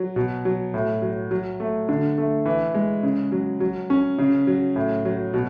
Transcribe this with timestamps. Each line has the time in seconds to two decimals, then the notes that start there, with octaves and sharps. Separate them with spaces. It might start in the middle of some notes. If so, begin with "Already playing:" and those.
Already playing: F#3
0.16 B2
0.45 F#3
0.74 A2
1.02 F#3
1.31 F#3
1.60 A3
1.89 D3
2.18 A3
2.46 E3
2.74 G#3
3.03 C#3
3.32 F#3
3.60 F#3
3.90 C#4
4.19 C#3
4.47 F#3
4.76 A2
5.05 F#3
5.33 B2